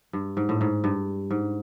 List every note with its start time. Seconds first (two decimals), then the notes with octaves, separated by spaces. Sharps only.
0.13 G2
0.37 G#2
0.49 A2
0.61 G#2
0.84 G2
1.31 G#2